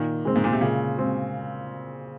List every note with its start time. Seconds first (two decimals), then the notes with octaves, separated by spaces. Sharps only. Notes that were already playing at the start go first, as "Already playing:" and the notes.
Already playing: A#2 D#3
0.25 G#3 C4
0.36 G#2
0.44 A#2
0.53 C3
0.61 A#2 C#3
0.97 G#3 C4